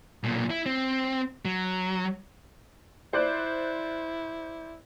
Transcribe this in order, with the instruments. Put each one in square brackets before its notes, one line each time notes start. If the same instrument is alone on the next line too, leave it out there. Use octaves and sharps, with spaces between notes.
[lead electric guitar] B1 A#2
E4
C4
F#3
[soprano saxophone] E4 [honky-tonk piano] C5 D5 F#6